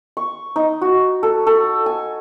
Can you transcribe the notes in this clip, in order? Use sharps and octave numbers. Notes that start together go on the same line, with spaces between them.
C#6
D#4
F#4
A4
A4
G#5